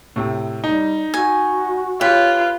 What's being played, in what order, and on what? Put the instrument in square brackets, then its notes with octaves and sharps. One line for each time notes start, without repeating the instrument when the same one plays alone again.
[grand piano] A2 C3
[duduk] G3 [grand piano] D#4
[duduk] F#4 [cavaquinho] G#5
[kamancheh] F4 [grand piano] G4 C#5 [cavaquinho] B4